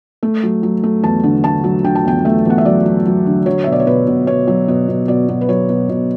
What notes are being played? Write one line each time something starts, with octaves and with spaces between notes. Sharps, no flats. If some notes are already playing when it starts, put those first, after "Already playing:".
A3
F#3
F#3
A3
E2 A5
D3
A3 A5
F#3
D3 G5
A5
E2 G5
A3 E5
E2 F#5
E5
F#3 D5
F#3
F#3
D3
F#3 C#5
B2 E5
D5
C#5
B2 B4
B2
B2 C#5
F#3
B2
B2
B2 D5
B2
B4
F#3 C#5
B2
B2